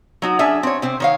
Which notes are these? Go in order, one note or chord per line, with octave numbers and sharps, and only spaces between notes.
F#3 D#4 F#4
C#4 D4 G#4 E5
C4 C#5
C3 C4
D#3 C#5 F5